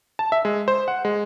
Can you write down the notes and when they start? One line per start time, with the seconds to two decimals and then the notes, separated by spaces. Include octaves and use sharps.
0.19 A5
0.32 E5
0.45 G#3
0.68 C5
0.88 F#5
1.05 G#3